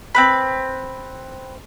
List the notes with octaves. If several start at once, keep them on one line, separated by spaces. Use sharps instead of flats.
C4 B4 B5